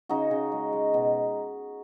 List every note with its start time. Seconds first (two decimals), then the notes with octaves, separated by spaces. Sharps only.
0.09 C#3 D#4 F#4
0.31 C#3
0.52 G#3
0.73 G#3
0.94 B2